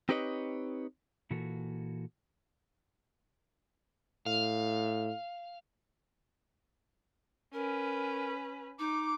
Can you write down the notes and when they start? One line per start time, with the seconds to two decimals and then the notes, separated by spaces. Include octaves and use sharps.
0.09 C4 D#4 G4 B4 C#5 D#5
1.31 A#2 E3 A#3 F#4 A4
4.26 A2 F5
7.54 C#4 A#4 B4
8.79 D#4 D6